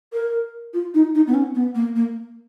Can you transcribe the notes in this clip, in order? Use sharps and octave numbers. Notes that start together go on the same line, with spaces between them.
A#4
F4
D#4
D#4
B3
C#4
B3
A#3
A#3